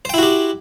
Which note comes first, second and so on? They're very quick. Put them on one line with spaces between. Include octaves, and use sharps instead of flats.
C5 G5 E4 F#4 G4